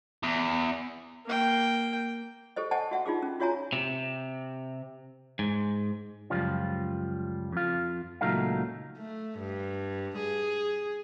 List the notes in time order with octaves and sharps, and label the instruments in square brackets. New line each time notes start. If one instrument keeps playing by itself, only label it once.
[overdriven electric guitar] E2
[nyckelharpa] A#3 G5
[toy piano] G4 A4 C5 D#5
C5 D#5 F#5 G#5 A5
F#4 E5 F#5
D#4 F4 G#4 D6
C#4
F4 F#4 C#5 E5 G#5 A#5
[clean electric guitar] C3
G#2
C#2 F#2 F3 G3 F4
F2 F4
C#2 A#2 F#3 A3 D#4 F5
[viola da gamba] A3
G2
G#4